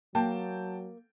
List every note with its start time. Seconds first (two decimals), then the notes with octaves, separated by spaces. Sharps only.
0.15 F#3 A#3 G5 A5